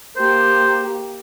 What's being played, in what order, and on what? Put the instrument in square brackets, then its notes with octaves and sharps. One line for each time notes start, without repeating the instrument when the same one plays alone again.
[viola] A#3 G4 [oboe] C5